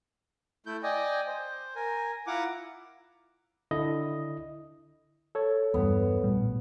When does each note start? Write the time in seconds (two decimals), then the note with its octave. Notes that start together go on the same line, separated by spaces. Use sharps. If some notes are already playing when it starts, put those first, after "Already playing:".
0.66 A3 E4 G6
0.83 D5 D#5 G5 G#5
1.27 C5
1.75 A#4 G#5
2.27 E4 F4 F#5 A#5 D6
3.71 D3 E4 D#5
5.35 A4 C#5
5.74 E2 G2 B3
6.24 A#1 A2 G3